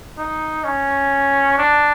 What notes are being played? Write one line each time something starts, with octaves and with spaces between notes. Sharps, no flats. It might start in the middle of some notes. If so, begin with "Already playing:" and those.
D#4
C#4
D4